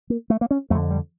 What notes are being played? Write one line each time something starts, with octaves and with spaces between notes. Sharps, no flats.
A#3
A3
A#3
C#4
F2 D3 A3
G3